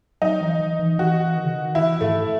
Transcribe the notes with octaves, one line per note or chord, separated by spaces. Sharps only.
F#3 D#4
E3
E3
E3
E3 F#4
D#3
C#3
D#3
E3 E4
G#2 A3